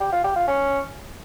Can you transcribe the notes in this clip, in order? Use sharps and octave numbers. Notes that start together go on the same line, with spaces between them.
G4
F4
G4
F4
C#4